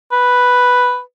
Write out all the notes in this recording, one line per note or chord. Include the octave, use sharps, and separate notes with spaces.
B4